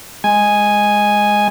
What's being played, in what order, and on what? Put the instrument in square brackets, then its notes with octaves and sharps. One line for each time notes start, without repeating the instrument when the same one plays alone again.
[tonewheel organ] G#3 G#5